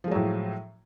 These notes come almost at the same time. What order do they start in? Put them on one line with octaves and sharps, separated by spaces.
F3 G#3 F#3 A2